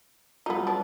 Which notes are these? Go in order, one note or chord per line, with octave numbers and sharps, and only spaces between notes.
F#3 G3 B3 D#4 F4
D4